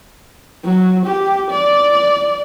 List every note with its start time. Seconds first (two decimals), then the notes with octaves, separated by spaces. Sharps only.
0.64 F#3
1.06 G4
1.51 D5